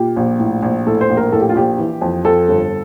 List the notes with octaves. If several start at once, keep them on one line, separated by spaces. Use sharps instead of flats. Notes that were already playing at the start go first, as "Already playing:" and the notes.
Already playing: A#2 G4
A#1
A2
A#1
A2 A4
C5
A#1
A#4
A2 A4
G4
F4
A#1 G4
E3
F2
F2 A4
G1